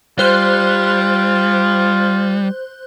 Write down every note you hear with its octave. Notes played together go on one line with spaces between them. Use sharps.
G3 F4 C5 F#6